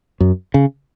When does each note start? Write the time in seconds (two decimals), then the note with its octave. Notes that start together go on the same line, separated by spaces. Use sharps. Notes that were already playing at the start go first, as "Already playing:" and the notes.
0.20 F#2
0.54 C#3